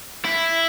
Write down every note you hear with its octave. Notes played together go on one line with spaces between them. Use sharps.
E4